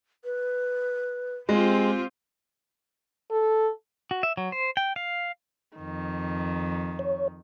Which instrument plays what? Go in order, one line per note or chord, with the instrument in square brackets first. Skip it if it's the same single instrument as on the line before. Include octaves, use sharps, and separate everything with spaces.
[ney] B4
[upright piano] G#3 [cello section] C4 F4 G4
[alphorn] A4
[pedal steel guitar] F#4
E5
F#3
C5
G5
F5
[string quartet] F2 D#3
[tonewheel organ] C#5